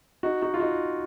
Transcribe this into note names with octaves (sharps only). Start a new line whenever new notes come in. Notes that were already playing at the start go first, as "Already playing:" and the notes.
D#4 F#4
D#4 F#4
F4
D#4 F#4